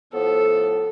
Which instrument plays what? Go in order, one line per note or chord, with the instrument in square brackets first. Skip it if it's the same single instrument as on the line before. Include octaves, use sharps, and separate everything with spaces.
[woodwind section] A2 F3 B3 [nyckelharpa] A4